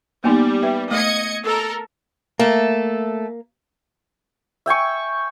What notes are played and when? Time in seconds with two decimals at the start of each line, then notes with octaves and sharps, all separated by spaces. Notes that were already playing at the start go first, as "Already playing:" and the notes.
0.24 G3 A#3 B3 D#4
0.62 B4 E5 G5
0.91 A3 D#5 G#6 C#7
1.43 A4 A#4
2.39 A3 A#3 A4
4.66 E5 G5 G#5 C#6